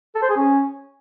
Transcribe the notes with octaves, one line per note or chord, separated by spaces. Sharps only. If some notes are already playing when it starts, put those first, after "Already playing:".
A4
C5
G#4
C#4